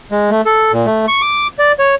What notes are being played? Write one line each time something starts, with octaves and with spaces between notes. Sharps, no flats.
G#3
A3
A4
A#2
A3
C#6
D6
D5
C#5